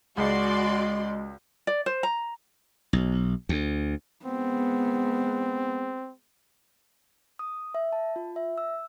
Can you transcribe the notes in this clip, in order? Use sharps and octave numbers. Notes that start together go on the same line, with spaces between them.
C#2 G#3 F#4 D5 C6
D5
C5
A#5
B1
D2
G#3 B3 C4
D#6
E5
A5
F4
E5
E6